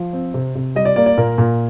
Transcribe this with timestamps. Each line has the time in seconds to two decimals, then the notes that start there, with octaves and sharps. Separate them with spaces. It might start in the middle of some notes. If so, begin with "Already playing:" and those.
Already playing: F3
0.13 C4
0.34 C3
0.55 C3
0.76 G3 D#5
0.85 D5
0.96 A#3 D5
1.06 D5
1.18 A#2 A#4
1.38 A#2